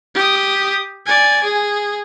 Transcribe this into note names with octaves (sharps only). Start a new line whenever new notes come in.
G4 D#6
D5 G#5
G#4